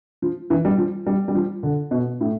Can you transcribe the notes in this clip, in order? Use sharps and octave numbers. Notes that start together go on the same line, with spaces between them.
F3
E3
G3
F3
G3
G3
F3
D3
B2
A2